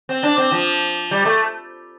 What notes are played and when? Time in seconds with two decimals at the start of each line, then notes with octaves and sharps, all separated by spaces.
0.09 C4
0.23 D4
0.38 C4
0.52 F3
1.11 G3
1.25 A3